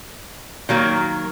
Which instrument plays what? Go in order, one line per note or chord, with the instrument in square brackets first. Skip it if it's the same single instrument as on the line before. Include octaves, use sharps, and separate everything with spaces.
[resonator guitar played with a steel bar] D#3 F#3 A#3